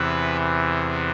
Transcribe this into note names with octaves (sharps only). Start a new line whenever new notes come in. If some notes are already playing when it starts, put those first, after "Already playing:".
Already playing: E2 C3 E3 B4